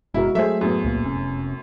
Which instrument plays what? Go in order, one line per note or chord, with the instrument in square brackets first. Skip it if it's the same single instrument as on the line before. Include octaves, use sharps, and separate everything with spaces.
[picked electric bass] F#1 B2 [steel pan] G#3 F#4 A#4 [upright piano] E4
[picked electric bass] F#3 A3 [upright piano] G#4 E5 [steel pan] A4 C5
[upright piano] F#2 A2 [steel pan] B3 G#4
[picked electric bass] C#2 A#2 A#3
F1 C3 C#4